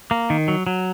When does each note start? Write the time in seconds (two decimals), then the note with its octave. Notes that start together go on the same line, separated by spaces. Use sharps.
0.11 A#3
0.30 D#3
0.48 F#3
0.67 F#3